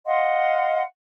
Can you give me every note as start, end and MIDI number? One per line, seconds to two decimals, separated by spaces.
0.05 0.81 75
0.05 0.81 77
0.05 0.81 78
0.05 0.81 84